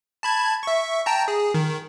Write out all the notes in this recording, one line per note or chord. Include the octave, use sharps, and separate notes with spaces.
A5 B5 G#6
E5 C#6
G5 A5 A#5
G#4
D#3